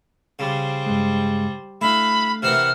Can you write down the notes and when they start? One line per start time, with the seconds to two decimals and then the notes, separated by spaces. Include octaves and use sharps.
0.39 C#3 G3 C5
0.86 G2 G#3
1.81 A3 D4 E4 F5 B5
2.42 C3 E3 E4 A#4 F#5 F6